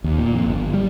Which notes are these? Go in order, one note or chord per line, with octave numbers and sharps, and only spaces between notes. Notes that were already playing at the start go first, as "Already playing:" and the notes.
D#2
A#2
F2
G1
G3